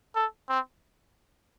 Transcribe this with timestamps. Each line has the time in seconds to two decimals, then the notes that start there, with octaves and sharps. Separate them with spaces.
0.16 A4
0.49 C4